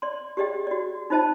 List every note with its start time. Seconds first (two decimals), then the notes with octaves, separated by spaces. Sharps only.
0.02 D5 C6
0.37 G4 G#4 D5 D#5 G5
0.67 F#4 D5
1.10 D#4 F4 C5 D#5 A5